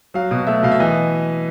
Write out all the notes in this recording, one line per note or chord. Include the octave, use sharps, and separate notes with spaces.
F#3 F5
B2
A3 E5
B2 F5
E5
E3 D#5